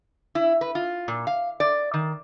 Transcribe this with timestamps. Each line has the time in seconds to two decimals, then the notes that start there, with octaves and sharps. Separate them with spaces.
0.35 E4
0.61 B4
0.75 F4
1.08 A#2
1.27 F5
1.60 D5
1.94 D#3